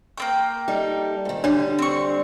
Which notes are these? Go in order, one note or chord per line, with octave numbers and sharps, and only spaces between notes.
A#3 C4 G5 C#6
G3 D#4 A4
G#2 D#3
D3 G3 D4 F#4 C#5
C4 C#6